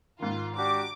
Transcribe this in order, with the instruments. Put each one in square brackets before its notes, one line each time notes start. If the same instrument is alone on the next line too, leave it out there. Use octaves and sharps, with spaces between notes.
[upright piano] G#2 D#3 [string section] F4
[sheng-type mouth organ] D4 F#4 G4 [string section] D6